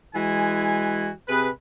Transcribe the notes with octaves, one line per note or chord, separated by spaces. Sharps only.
E3 G#3 F#4 G#5
C3 G#4 B4